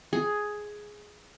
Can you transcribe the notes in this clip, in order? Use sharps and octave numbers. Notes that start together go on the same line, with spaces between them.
G#4